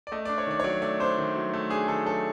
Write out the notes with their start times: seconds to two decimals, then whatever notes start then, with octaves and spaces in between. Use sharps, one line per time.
0.07 D5
0.12 A3 D#5
0.25 D5
0.29 D4
0.38 C#5
0.47 D#3 D5
0.60 C#5
0.64 F#3 D5
0.82 A3 D5
1.00 D4 C5
1.18 D#3
1.36 F#3
1.53 A3
1.70 D4 G#4
1.88 D#3 A4
2.05 F#3 A4